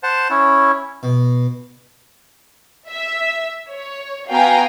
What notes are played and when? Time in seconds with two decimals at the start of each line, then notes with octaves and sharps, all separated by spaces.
0.03 C5 F#5 A5
0.30 C#4 E4
1.03 B2
2.88 E5
3.72 C#5
4.29 B3 F#4 F5 G5 G#5 A#5